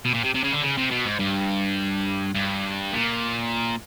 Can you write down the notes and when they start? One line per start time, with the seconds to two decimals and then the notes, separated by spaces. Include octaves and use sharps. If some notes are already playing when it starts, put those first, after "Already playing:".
0.05 B2
0.14 A#2
0.24 C3
0.34 C3
0.44 C#3
0.52 D3
0.62 C#3
0.77 C3
0.91 B2
1.05 G#2
1.19 G2
2.35 G2
2.93 A#2